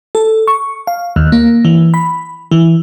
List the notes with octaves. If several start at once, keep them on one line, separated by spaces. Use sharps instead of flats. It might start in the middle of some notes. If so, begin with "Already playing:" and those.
A4
C#6
F5
D#2
A#3
E3
B5
E3